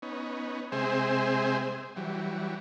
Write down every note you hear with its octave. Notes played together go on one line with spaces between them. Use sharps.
B3 C#4 D#4
C3 G#3 C4 G#4 C5 E5
E3 F#3 G3